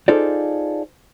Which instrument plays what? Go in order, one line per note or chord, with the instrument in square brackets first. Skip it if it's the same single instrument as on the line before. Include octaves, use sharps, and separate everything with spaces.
[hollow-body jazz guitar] D#4 F4 G#4 A4 C5 D5